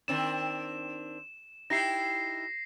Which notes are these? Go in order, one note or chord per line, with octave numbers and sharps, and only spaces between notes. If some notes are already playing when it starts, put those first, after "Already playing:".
D#3 C4 D4 E7
D#4 E4 G4 A#6 C7